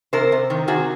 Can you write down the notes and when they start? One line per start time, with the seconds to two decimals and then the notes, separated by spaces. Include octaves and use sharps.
0.13 C3 A#4 C5
0.32 C3
0.50 D#3
0.68 C3 F#4 G#4